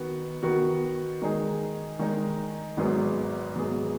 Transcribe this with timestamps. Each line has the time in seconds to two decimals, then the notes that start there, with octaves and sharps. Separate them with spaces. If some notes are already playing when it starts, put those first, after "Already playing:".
Already playing: D#3 B3 F#4
0.43 D#3 B3 F#4
1.22 D#3 G#3 D#4 G#4
1.99 D#3 G#3 D#4 G#4
2.77 G#1 G#2 F#3 B3 G#4
3.56 G#1 G#2 F#3 B3 G#4